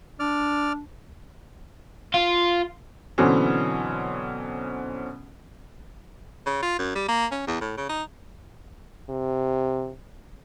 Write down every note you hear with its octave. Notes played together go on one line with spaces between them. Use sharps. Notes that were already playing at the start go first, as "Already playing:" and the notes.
D4 D5 F6
F4
B2 D3 E3 F#3 C4 C#4
C#3
F4
F#2
G3
A#3
C#4
E2
A2
C#3
D#4
C3